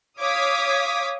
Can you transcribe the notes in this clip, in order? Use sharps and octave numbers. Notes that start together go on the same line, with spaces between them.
C#5 F5 D6 D#6 G#6 B6